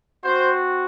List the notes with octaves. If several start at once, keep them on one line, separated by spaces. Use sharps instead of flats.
C4 F#4 C5